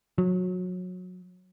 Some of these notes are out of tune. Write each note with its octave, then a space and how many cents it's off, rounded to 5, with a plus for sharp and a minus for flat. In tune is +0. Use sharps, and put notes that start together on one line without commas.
F#3 -25